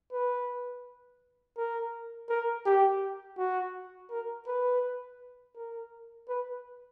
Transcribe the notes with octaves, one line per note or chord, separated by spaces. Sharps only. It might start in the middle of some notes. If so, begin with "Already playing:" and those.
B4
A#4
A#4
G4
F#4
A#4
B4
A#4
B4